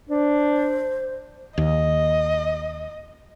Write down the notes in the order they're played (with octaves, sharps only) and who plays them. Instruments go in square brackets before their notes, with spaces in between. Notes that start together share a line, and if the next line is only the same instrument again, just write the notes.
[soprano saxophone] D4 [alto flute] C5
[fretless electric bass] D#2 [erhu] D#5